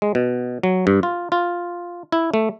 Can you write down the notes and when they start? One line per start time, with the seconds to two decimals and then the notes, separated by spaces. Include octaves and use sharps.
0.02 G#3
0.15 B2
0.63 F#3
0.87 G2
1.03 F4
1.32 F4
2.12 E4
2.34 A3